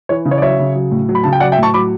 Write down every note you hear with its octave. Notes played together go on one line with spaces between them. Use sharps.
E3 C#5
C#3
C#5
D5
F#3 C#5 E5
C#3
F#3
A2
F#3
B5
C#3 A5
G5
F#3 D5 F#5
E5 G5
A2 A5 C#6
F#3 B5 D6